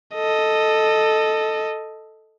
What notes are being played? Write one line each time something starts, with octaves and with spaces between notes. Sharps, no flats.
A4 D#5